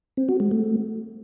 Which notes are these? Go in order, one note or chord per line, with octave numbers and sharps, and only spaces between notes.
C4
F#4
G#3
A3